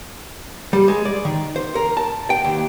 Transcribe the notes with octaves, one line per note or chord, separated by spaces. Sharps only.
G3
G#3
D5
D#3
C5
A#4
A5
G5
D#2